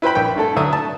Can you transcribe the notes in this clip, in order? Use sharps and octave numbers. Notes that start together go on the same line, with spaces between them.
E4 B4 C5 G5 B5
A#1 G5
G2 A3 A4
D2 F#3 E5 D#6
A5